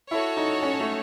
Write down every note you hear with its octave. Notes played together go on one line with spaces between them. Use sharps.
E4 F#4 A4 C#5
D#4
C#4
A3